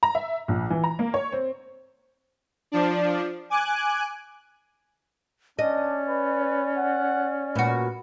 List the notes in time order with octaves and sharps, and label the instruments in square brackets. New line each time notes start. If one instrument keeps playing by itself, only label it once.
[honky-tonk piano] A#5
E5
A#1
E3
A#5
A#3
C#5
C4
[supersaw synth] F3 D4
G#5 D6 F#6
[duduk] C#4 [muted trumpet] D4 [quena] D5 [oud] D#5
[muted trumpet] B4
F#5
[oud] A#2 F#4 [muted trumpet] B4